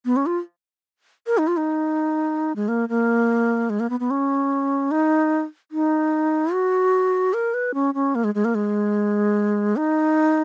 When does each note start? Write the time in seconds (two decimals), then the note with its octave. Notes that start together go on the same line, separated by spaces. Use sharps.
0.05 B3
0.16 C#4
0.26 F4
1.27 A#4
1.38 D#4
1.47 F4
1.57 D#4
2.56 G#3
2.68 A#3
2.89 A#3
3.70 G#3
3.80 A#3
3.90 B3
4.00 B3
4.11 C#4
4.91 D#4
5.72 D#4
6.53 F#4
7.33 A#4
7.54 B4
7.74 C#4
7.94 C#4
8.15 A#3
8.24 G#3
8.35 G#3
8.45 A#3
8.55 G#3
9.76 D#4